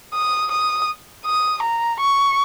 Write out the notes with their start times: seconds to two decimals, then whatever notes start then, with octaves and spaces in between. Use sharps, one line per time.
0.14 D#6
0.51 D#6
1.25 D#6
1.62 A#5
2.00 C#6